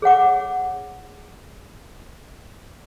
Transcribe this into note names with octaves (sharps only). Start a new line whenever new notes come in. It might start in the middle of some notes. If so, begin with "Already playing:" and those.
G#4 C#5 F#5 D6